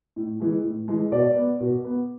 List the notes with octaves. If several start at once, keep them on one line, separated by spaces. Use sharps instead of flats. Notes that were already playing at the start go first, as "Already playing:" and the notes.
A2
E3 G#3
A2
E3 G#3
B2 D5
B3
B2
B3